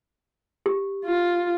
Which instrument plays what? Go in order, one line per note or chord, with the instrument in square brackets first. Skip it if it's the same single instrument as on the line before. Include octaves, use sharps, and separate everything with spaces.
[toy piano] G4
[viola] F4